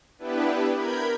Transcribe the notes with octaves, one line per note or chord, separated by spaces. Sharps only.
B3 D4 E4 G4 B4
A#4 B5 G6 G#6